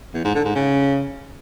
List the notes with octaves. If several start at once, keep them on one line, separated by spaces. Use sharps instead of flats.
E2
G#2
D3
G#2
C#3